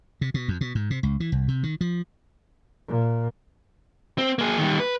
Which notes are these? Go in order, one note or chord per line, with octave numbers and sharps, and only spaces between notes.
C3
B2
F2
B2
G#2
C3
C#2
E3
C2
C3
D#3
F3
A#2
C4
A#3 G#4
D#3 G3
B4